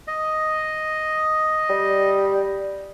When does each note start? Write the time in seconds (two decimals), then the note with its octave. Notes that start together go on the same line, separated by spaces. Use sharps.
0.08 D#5
1.70 G3